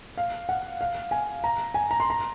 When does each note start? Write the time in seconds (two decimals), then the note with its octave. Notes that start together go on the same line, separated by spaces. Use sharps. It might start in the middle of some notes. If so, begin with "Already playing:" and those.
0.17 F5
0.49 F#5
0.81 F5
1.11 G#5
1.44 A#5
1.74 G#5
1.91 A#5
2.00 C6
2.10 A#5